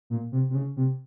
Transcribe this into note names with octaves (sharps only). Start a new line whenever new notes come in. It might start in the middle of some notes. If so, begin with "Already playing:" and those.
A#2
C3
C3
C#3
C3